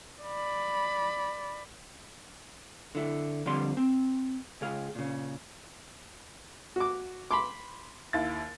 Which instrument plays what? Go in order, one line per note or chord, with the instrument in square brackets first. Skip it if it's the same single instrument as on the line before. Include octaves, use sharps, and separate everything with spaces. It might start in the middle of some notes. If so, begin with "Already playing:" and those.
[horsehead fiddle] D5 B5
[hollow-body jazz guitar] D3 E4
F2 D3 G3 C4 C6
C4
C#2 G#4 F5
A#2 C#3
[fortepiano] F#4 D6
B5 C6 D6
[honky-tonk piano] D#2 E4 A6